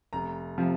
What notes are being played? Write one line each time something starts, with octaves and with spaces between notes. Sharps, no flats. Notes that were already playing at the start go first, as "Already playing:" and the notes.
F1 A#5
C3 F3